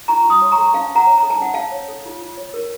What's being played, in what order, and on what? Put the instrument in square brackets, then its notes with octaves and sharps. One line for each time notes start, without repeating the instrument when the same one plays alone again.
[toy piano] F4 A#5 C#6
F4
C6 D#6
C#5
A#5 C#6
A4
C#4 F5 A5
C#4
F#5 A#5
C#5
A4 A#5
A5
C#4 F#5
C#4 F5 A5
C#5
A4
F4
F4
C#5
A#4